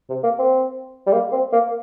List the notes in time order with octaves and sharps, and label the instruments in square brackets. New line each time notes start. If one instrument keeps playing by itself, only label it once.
[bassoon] C3
A#3
C4
G3
A#3
C4
A#3